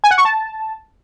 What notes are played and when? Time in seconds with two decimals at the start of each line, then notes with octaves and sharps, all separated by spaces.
0.04 G#5
0.11 F#5
0.18 C#6
0.25 A5